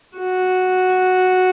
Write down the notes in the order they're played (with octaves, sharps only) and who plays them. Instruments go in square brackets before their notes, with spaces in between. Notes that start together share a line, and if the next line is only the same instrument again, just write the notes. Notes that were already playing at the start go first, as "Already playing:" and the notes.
[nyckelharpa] F#4